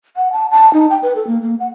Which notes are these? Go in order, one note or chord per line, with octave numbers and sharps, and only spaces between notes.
F#5
A5
A5
D#4
G5
B4
A4
A#3
A#3
F#5